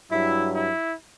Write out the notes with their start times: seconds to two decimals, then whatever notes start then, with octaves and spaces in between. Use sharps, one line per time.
0.10 G2 F#3 E4
0.54 E4